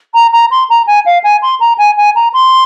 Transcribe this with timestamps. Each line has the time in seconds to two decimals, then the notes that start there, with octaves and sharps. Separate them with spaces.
0.14 A#5
0.32 A#5
0.51 C6
0.69 A#5
0.87 G#5
1.05 F5
1.24 G#5
1.42 C6
1.60 A#5
1.78 G#5
1.97 G#5
2.15 A#5
2.33 C6